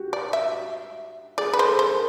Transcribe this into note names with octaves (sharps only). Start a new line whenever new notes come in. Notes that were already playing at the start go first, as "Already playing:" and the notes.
Already playing: F#4 G4
D5
E5
G#4 D5
B4
C5
A4
C5
A#4